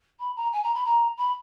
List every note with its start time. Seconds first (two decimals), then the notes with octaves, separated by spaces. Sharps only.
0.19 B5
0.36 A#5
0.53 G#5
0.64 A#5
0.75 B5
0.85 A#5
1.17 B5